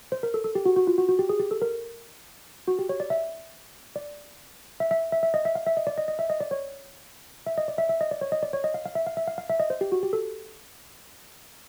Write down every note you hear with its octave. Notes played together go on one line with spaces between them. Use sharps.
C5
A#4
A4
A4
G4
F#4
F#4
F4
F#4
F#4
G4
G#4
G4
A4
A#4
F#4
G4
C#5
D5
E5
D5
E5
E5
E5
E5
D#5
E5
F5
E5
D#5
D5
D#5
D#5
E5
D#5
D5
C#5
E5
D#5
D5
E5
E5
D#5
D5
C#5
D#5
D5
C#5
D#5
F5
F5
E5
F5
E5
F5
F5
E5
D#5
C5
G4
F#4
G4
A4